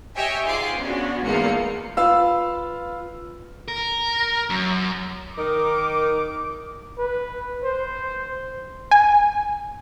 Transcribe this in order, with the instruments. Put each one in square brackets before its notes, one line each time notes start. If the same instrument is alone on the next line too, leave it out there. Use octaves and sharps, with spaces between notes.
[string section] G4 C#5 D#5 E5 G5 G#5
G#2 F4 G#4 C6 D6
B3 C#4 D4 F#4
E2 G#2 A3 A#3 F4 C#7
[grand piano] F4 B4 F5 E6
[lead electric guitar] A#4
F#2
[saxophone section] D#3 D#4 A#4 [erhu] D6
[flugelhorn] B4
C5
[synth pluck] G#5